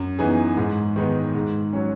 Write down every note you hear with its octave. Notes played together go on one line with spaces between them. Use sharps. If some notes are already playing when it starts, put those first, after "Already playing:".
Already playing: F#2
E3 B3 D#4 G#4
G#2
D#3 G#3 B3 D#4
G#2
F#3 C#4